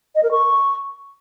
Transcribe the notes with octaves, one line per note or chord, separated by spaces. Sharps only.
D#5
A#4
C#6